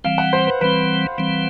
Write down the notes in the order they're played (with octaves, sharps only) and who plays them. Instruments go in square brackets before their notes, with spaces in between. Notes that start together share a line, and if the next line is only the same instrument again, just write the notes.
[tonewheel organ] E3 G3 C4 [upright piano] F5
[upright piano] F#5
C5
B4
[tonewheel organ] E3 G3 C4 [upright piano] B4
[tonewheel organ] E3 G3 C4